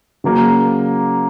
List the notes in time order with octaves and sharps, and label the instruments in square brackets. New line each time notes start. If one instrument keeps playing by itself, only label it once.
[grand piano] C#3 F#3 A#3